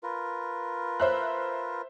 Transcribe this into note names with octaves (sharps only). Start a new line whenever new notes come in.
F4 A#4 B4
C5 E5 F#6